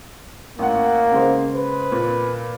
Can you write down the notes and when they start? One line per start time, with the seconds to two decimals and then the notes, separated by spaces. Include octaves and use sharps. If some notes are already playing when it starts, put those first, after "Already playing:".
0.59 A1 A#3 F#5
1.12 C#3 G#3 C5
1.54 B4
1.92 A#2